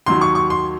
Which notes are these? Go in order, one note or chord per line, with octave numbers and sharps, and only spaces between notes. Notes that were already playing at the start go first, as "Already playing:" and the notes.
D#2 D#3 F#3 C6
C#6
C#6
C6